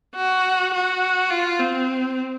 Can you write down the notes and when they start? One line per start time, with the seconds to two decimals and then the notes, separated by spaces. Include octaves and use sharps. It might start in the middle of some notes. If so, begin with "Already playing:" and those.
0.15 F#4
0.74 F#4
1.31 F4
1.60 C4